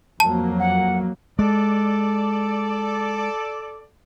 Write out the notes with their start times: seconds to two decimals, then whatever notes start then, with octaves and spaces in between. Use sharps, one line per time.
0.20 F2 F#3 A#3 A5
0.59 F#5
1.39 G#3 A4 D5